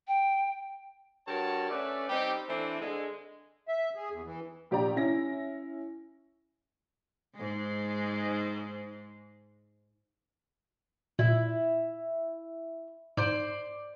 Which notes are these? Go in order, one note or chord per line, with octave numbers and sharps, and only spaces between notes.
G5
G2 F#4 A#4 C#5 A5
A3 C#4 B4 D5
G3 C4 D#4 G4
E3 A3 C4 D4
D3 G#3
E5
G#4
E2
E3
A#1 G4 D5 A#5
C#4 E4 A#6
G#2 G#3
A#2 E4
G#2 C5 D5